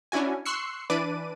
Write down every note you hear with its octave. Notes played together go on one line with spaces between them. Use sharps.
C#4 D4 E4 F#4 G#5
C6 C#6 E6 F#6 C7 C#7
E3 D4 B4 D5 D6 D#7